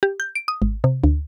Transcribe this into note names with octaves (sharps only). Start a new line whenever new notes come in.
G4
G6
D7
D#6
G#1
C3
D2